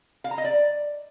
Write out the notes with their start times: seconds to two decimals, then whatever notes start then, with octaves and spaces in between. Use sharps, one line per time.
0.24 F5
0.31 A#5
0.38 D#5
0.44 D5